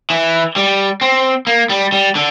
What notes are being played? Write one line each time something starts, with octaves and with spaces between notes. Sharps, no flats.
E3
G3
C4
A#3
G3
G3
D3